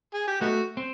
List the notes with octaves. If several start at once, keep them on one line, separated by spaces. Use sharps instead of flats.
G#4
G4
A3 B3 D#4 F#4
C4